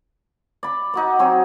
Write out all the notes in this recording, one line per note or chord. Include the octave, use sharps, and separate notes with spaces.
D5 B5
D#4 F#4 D5
F#3 C4 C#5 G#5